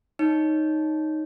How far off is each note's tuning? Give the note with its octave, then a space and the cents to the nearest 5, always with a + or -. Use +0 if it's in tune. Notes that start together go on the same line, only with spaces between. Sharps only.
D#4 +0 C#5 +0